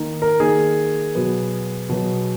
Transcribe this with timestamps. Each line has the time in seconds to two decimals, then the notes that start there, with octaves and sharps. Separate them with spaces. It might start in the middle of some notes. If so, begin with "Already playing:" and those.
Already playing: D#3 A#3 D#4
0.22 A#4
0.40 D#3 A#3 D#4 G#4
1.15 B2 F#3 B3
1.89 B2 F#3 B3